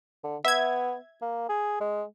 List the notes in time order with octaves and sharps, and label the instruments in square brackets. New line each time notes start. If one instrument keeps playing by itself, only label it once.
[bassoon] D3
[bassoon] B3 [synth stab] E5 G#6
[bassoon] A#3
G#4
G#3